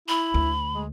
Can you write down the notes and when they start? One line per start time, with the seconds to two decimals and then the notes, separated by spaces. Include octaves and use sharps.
0.08 E4 B5
0.34 D2
0.75 G#3